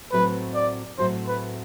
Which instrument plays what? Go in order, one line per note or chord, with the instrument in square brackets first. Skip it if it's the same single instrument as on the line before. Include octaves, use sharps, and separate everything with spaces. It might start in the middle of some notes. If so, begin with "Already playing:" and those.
[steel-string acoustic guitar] A2 F#3 C4 F#4 A4 [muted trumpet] B4
[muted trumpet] D5
[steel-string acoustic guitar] A2 F#3 C4 F#4 A4 [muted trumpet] C5
[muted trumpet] B4